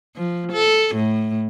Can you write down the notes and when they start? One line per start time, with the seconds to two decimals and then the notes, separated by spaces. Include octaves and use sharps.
0.16 F3
0.52 A4
0.96 A2